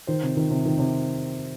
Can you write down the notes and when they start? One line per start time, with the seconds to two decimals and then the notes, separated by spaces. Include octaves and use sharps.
0.07 D#3 C5
0.23 C3
0.37 D#3
0.50 C3
0.65 D#3
0.79 C3